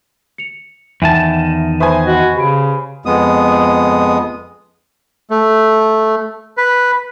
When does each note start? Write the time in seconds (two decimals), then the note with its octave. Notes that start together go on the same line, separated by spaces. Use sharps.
0.38 C#7 F7
1.02 E2 D#3 E5 F#5 G#5 A5
1.80 B4 C5 E5 G#5 C#6 D#6
2.06 F#4 D#5 B5
2.36 C#3 G4 B5 D7
3.06 F2 G#3 B3 D#6
5.30 A3
6.57 B4